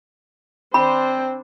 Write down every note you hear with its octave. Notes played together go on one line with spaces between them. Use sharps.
C4 D4 C5 B5